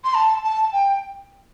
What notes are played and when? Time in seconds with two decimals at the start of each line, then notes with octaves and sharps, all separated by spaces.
0.04 C6
0.14 A5
0.44 A5
0.73 G5